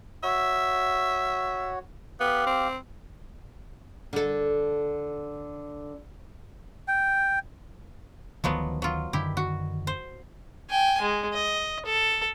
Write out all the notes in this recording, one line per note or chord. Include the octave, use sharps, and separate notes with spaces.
F#4 C#5 E5
B3 G4 F5
C4
D3 A4
G5
D2 D#3 F3 F#3 B3
F#3 F4
F#2 D3 D#3 E4 G4
F#4
C5
G5 G#5
G#3
D#5
A4